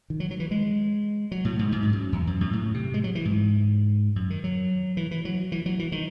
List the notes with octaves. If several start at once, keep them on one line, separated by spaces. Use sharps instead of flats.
D#3
F#3
F#3
E3
G#3
F#3
A2
G#2
G#2
G#2
F#2
E2
F#2
F#2
A2
C3
G#3
F#3
E3
G#2
F#2
D#3
F#3
E3
E3
F#3
E3
F#3
E3
D#3